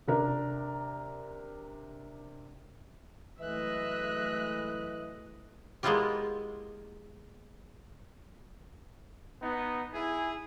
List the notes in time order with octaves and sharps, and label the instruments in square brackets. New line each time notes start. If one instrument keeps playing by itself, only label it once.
[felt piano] C3 D4 A#4
[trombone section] E3 [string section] F#3 G#3 A3 [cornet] D#5 [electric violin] E5 F#6
[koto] G#3 A#3 B3 E4 F4 G4
[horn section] B3 D#4
E4 G#4